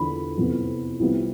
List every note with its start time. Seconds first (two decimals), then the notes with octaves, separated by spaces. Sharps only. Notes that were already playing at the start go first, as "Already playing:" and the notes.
Already playing: E2 D3 F3 B5
0.38 F2 C3 E3 B3
1.00 C2 C3 F3 B3